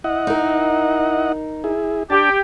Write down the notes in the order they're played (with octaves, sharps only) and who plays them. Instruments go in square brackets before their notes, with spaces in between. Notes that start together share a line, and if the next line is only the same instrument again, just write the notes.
[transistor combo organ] E4 D#5 F#5
[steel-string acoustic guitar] D#4 A#4
[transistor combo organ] E4 G#4
[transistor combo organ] D4 A5 [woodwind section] G4